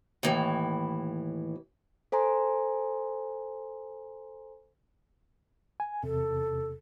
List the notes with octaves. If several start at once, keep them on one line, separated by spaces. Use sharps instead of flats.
D#2 A2 E3
A4 C5 G#5 A#5 C6
G#5
E2 C3 A4